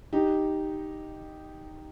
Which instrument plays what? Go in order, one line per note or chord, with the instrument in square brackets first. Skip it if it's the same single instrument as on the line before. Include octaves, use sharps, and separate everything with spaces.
[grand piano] D#4 G4